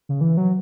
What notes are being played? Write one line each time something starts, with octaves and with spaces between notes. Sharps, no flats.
C#3
E3
F#3